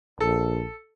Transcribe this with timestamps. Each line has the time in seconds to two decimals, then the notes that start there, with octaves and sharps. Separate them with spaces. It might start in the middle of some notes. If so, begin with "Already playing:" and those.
0.20 A#1 A4